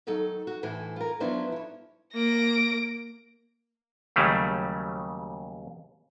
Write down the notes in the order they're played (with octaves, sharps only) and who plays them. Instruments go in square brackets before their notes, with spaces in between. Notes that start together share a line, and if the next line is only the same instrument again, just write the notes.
[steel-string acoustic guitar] D#3 F#3 D#4 A4
F#4
D2 A2 E3 E4 C5 G#5
F4 A#4
F3 F#3 B3 D4 E4 C5
E4 C#5
[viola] A#3 [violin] A#6 D7
[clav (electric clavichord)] D#2 C#3 F#3 G3 A3